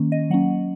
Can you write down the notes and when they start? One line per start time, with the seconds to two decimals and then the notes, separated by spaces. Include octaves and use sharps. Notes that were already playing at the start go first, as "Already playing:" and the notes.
Already playing: D#3 A#3 C#4
0.12 D#5
0.30 F#3 A#3 C#4 F#5